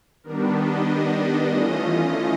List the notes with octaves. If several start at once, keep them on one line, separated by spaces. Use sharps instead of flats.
D#3 G3 B3 D4 A#4
D#5
E3 A3 C#4 F4 D#5